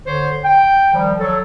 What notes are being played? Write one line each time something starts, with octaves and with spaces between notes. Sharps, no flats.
D3 C5 C#5
G5
D#3 F3 G3
F#3 A4